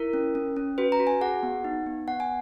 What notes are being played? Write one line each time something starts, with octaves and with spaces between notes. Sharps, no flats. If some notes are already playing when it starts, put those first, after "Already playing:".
Already playing: E4 A#4
C#4
C#4
C#4
F#4 B4
A#5
F#4
G#5
G#4 F#5
B3
D#4
B3
B3 F#5
G#5